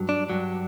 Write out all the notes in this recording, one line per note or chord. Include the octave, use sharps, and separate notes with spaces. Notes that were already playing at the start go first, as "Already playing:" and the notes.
Already playing: G2 F#3
D4
G2 F#3